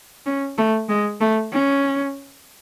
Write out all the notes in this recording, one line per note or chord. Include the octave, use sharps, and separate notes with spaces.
C#4
A3
G#3
A3
C#4